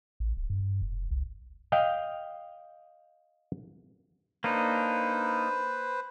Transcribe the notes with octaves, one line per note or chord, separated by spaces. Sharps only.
A1
D1
G2
F1
C2
D#5 F5 G5
A#3 D4 D#4 B4 C5